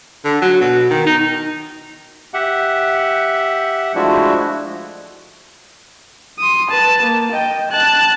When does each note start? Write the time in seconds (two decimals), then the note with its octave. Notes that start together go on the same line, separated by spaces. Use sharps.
0.25 D3
0.42 F#3
0.61 B2
0.90 D#3
1.07 D#4
2.34 G4 E5 F#5
3.95 F3 G#3 A3 D4 E4 F#4
6.39 C6 D#6
6.70 B4 A5
7.02 A#3
7.32 D#5 G5
7.71 A5 F#6